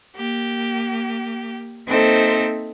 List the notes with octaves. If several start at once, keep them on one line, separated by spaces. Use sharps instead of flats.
A#3 G4
A#3 C4 D#4 A4 C5 E5